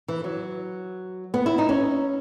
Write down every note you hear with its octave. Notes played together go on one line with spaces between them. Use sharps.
E3
F#3
B3
E4
D#4
C#4